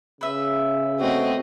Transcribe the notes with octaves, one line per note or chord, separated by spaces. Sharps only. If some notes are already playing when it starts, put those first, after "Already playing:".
C#3 B4 E5
A3 B3 C4 F#4 D#5